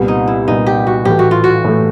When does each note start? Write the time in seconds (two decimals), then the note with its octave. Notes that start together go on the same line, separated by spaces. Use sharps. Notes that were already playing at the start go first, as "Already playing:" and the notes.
Already playing: C2 A#2 G3 B3
0.08 D#4
0.28 E4
0.48 C2 A#2 G3 B3 D#4
0.67 G4
0.87 F#4
1.05 A2 E3 A3 G4
1.19 F#4
1.31 F4
1.44 F#4
1.64 A2 E3 A3